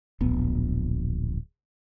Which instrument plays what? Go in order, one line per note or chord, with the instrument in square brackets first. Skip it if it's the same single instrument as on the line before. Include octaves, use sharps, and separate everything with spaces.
[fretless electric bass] D1 A#1 B3